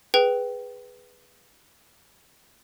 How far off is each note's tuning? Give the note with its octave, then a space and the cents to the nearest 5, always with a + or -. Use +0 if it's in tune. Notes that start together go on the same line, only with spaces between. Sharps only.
G#4 +0 B4 +0 G5 -10